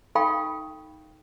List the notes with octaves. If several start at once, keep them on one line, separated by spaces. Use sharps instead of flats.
D#4 A4 F5 G5 B5 C#6